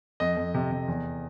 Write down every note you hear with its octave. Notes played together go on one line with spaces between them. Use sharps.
F2 D#5
F2
C3
C3
E2